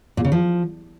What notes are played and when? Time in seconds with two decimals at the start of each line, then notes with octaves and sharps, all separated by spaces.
0.17 A#2
0.25 C#3
0.32 F3